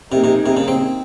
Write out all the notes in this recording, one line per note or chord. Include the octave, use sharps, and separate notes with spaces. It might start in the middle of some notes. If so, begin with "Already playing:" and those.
C3 A#3 D#4 G#4
C3
C3
C#3
C4